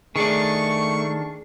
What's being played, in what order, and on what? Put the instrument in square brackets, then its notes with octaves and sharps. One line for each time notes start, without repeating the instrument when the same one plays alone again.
[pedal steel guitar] D#3 D4 [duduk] A3 [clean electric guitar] G#4 D5 [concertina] C#6